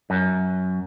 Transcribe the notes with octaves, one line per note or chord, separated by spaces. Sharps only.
F#2